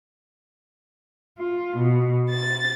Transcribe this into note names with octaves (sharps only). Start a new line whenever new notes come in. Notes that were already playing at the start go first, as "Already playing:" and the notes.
F4
B2
A6